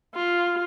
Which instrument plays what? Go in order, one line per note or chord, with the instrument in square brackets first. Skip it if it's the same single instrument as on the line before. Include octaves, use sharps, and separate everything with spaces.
[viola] F4